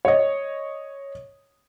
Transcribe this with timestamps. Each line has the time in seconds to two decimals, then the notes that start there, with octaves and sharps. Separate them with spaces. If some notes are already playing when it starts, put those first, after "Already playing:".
0.05 C#5 D#5